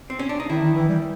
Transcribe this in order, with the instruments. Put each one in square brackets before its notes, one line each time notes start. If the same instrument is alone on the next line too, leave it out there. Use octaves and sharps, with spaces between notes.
[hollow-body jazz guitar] C4
C#4
D4
D#4
[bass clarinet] D#3 [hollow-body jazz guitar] E4
[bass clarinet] D#3
E3
G3